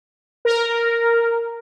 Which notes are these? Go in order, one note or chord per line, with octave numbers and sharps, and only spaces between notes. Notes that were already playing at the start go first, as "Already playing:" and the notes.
A#4